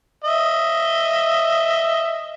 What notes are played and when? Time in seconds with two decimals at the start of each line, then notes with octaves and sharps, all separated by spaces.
0.24 D#5 E5